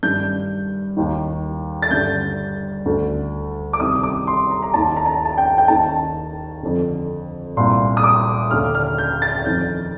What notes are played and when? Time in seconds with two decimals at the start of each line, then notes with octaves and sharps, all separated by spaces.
0.03 G2 D#3 G6
0.97 D#2 D#3
1.82 A6
1.91 G2 D3 G6
2.85 D2 D3
3.73 D6
3.80 C2 C3 D#3 D#6
4.03 D6
4.27 C6
4.51 A#5
4.63 A#5
4.74 D#2 D#3 A5
4.97 A#5
5.06 A5
5.25 A5
5.38 G5
5.58 G5
5.68 D#2 D#3 A5
6.63 F2 D3
7.57 C2 A#2 C6
7.97 D#6
8.04 D6
8.51 D#2 D3 F6
8.75 F6
8.98 G6
9.22 A6
9.45 F2 D#3 G6